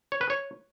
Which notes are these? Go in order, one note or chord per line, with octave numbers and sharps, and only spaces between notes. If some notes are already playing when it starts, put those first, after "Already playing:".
C#5
B4
C#5